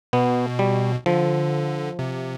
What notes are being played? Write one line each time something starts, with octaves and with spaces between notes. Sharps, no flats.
B2 B3
G3
D3 F3
C3